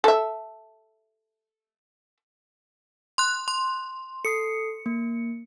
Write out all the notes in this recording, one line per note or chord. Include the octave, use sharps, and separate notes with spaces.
A4 E5
C6 F#6
C6
A4 D#6 C7 C#7
A#3